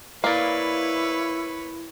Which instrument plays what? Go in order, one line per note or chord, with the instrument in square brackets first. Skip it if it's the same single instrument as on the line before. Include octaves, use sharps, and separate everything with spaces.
[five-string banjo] A#3 [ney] E4 [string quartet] B4 C#5 [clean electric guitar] D5 F5